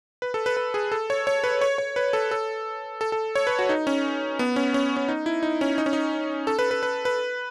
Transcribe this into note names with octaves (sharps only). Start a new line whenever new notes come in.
B4
A4
B4
B4
G#4
A4
C#5
C#5
B4
C#5
C#5
B4
A4
A4
A4
A4
C#5
B4
F#4
D#4
C#4
B3
C#4
C#4
C#4
D#4
E4
D#4
C#4
D#4
C#4
D#4
A4
B4
B4
B4
B4